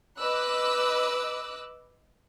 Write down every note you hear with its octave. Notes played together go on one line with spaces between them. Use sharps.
B4 D#5 D6 E6 F#6